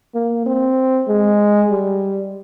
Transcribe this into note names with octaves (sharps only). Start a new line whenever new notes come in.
A#3
C4
G#3
G3